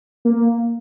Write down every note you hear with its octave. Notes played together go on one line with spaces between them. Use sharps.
A#3